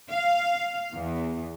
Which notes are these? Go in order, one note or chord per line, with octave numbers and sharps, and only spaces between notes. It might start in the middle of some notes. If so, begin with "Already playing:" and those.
F5
E2